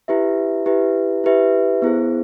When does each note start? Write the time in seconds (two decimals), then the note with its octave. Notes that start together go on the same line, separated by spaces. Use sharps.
0.08 E4 G4 B4 E5
0.66 E4 G4 B4 E5
1.24 E4 G4 B4 E5
1.82 B3 E4 G#4 C5